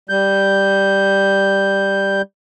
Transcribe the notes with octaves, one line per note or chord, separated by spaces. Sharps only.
G3 G6